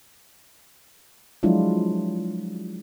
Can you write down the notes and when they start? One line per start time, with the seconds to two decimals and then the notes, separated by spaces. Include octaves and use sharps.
1.43 F3 F#3 G#3 D4 E4 F4